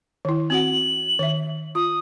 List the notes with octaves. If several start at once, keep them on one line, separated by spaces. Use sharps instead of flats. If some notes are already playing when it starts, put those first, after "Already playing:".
D#3 E4
C4 F#4 F#5 F#7
D#3 E5
F4 D#6